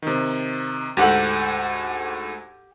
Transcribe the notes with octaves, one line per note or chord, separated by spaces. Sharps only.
C3 D#3
D2 G#2 G4 A4 F#5 G5